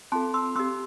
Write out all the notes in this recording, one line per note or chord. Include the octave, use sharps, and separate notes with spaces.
C4 F4 A4 A5 C6
C6 E6
C4 G4 C6 E6